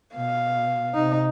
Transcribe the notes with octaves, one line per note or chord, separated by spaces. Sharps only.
B2 F5
C3 D#4